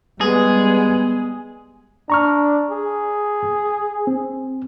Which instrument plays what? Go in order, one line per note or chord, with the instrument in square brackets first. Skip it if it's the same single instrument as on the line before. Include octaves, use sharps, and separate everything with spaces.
[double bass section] G3 B3 [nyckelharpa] G#3 [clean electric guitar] G#4
[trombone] D4 [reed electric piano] A#5 C#6 F6
[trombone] G#4
[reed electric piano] C4